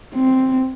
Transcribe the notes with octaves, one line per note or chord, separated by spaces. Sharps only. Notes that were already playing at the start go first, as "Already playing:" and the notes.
C4